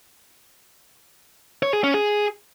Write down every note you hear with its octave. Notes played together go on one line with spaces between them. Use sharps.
C#5
G#4
C#4
G#4